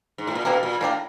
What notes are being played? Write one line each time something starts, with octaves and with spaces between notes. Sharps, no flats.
G#2
A2
A#2
B2 A#3 D4 G4 A#4
A#2
A2 A#3 D4 G4 A#4